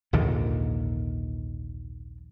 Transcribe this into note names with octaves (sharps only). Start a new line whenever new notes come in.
A#1 D#2 G#2 D3